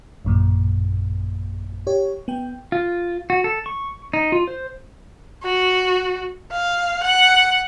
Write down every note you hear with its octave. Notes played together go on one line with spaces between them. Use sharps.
A1 F#2 A#2
G4 C#5
B3 G5
F4
F#4
A4
C#6
D#4
F4
C5
F#4
F5
F#5